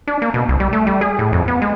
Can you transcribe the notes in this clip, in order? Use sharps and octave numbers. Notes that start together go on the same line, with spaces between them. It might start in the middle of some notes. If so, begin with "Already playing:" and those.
D4
A#3
B2
C2
G3
A3
G3
G#4
A2
F2
B3
G#3